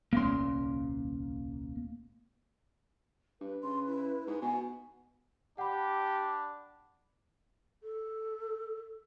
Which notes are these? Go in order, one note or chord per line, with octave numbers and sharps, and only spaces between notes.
D#1 C2 A#3 C#4 C6
G2 B4
C#3 C6
E4
G#2 G#4
B2 F#5 G#5
D4 G4 F#5 B5
A4